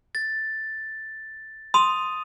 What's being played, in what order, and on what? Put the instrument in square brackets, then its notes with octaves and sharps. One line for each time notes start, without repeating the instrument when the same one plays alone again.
[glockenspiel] A6
[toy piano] C6 [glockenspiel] D#6 D#7 F7